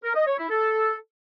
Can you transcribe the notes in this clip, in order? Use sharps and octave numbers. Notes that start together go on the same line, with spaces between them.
A#4
D#5
C#5
E4
A4